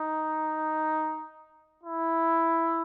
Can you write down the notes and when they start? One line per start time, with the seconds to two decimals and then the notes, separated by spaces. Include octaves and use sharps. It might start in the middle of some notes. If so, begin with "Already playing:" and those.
Already playing: D#4
1.83 E4